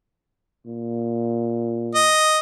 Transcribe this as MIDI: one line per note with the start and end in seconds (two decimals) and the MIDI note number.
0.66 2.15 46
1.95 2.39 75